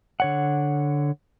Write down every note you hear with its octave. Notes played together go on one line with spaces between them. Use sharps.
D3 C#5 F#5